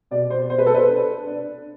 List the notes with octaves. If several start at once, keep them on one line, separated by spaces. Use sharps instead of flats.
B2 D5
C5
B3 C5
B4
A4
B4
D4
D4